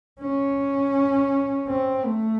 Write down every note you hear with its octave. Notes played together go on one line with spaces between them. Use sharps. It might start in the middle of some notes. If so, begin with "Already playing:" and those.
C#4
C4
A3